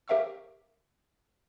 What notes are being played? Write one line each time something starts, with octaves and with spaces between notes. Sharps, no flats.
G4 A#4 E5 F5 C#6 E6